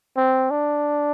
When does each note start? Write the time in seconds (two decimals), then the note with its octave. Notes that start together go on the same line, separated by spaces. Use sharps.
0.16 C4
0.51 D4